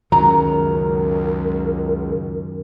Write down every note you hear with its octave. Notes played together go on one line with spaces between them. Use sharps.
C#2 F#2 D#3 F#3 A#4 A#5